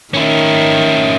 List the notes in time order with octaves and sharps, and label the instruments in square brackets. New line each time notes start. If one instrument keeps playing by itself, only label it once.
[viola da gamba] D#3 [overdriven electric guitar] C#4 E4